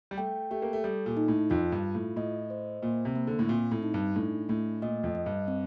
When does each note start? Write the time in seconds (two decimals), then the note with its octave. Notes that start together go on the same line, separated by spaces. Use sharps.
0.11 G3
0.18 A3 G5
0.51 A3 G4
0.62 A#3
0.73 A3
0.84 G3 A4
1.06 A#2
1.17 D#4
1.28 A2
1.50 F2 F4
1.72 G2
1.83 F4
1.95 A2
2.16 A2 D#5
2.50 C5
2.82 A#2 A#3
3.05 C3
3.15 A#3
3.27 D3
3.39 A2
3.49 A#2 C4
3.71 A2
3.82 D#4
3.94 G2
4.15 A2 D4
4.49 A2 A3
4.82 A#2 D#5
5.04 F2
5.15 D#5
5.26 G2
5.48 C4